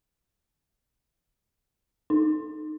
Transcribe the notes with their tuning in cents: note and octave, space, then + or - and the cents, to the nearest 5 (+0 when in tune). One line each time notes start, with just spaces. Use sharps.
D#4 -15